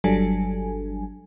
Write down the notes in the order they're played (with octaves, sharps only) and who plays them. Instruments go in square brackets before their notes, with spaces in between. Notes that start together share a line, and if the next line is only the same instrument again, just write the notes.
[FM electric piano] G1 F#3 G3 D4 A4 G#5